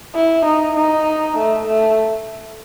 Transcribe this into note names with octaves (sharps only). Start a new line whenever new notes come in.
E4
D#4
D#4
A3
A3